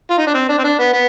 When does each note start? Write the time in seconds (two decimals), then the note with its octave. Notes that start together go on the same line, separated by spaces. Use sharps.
0.10 F4
0.18 D#4
0.27 D4
0.34 C4
0.49 D4
0.58 C4
0.64 D4
0.79 B3
0.93 B3